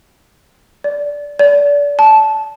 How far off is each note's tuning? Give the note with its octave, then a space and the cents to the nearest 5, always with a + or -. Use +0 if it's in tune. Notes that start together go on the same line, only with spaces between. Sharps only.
D5 -15
D5 -30
A5 -15